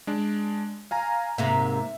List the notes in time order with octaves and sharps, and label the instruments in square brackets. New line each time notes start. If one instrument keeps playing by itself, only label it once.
[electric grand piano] G#3 D4
F5 G#5 A#5
[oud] G#2 C3 A#3 [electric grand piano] E5